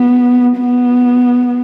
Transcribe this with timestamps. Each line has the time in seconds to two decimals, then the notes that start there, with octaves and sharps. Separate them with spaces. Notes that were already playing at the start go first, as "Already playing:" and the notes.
Already playing: B3
0.59 B3